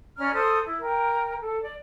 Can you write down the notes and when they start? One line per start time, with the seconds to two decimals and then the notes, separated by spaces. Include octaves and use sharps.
0.18 C#4 D5 A#5 F6
0.34 A4 C5 C6 D#6
0.66 E4
0.80 A#4 G5
1.39 A4
1.63 D5